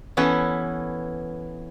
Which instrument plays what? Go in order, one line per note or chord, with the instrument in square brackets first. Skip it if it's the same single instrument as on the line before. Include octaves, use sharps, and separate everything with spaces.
[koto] E3 B3 C#4 E4 A4 B4